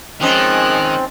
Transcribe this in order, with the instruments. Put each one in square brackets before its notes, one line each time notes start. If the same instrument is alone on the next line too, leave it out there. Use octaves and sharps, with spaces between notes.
[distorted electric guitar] D#3 [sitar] F3 C#4 D#4 [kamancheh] G#3 F#6 [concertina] C4